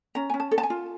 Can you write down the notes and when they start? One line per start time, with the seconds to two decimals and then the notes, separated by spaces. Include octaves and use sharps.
0.15 C#4 A#5
0.29 C#4 G#5
0.40 A5
0.51 A4
0.58 A5
0.63 G#5
0.70 F4